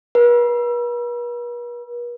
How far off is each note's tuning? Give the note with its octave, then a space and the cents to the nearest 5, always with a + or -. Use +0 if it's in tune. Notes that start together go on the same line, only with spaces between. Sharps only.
B4 -45